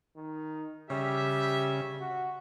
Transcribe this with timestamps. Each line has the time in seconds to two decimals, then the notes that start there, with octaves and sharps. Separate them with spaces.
0.16 D#3
0.90 C#3 G3 G4 E5
2.00 F#4